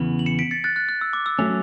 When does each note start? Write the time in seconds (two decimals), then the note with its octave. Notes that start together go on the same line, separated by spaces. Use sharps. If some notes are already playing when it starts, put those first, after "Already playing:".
Already playing: E2 C#3 E3 B3
0.19 F#7
0.26 C#7 E7
0.39 B6 D7
0.51 A6 C#7
0.64 F#6 A6
0.76 F#6
0.89 F#6
1.01 E6
1.13 D6
1.26 E6
1.39 F#3 A3 C#4